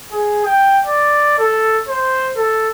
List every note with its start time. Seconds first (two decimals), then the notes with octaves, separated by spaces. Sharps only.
0.11 G#4
0.45 G5
0.86 D5
1.39 A4
1.88 C5
2.36 A4